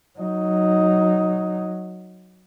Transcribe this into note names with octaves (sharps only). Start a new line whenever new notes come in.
F#3 D#4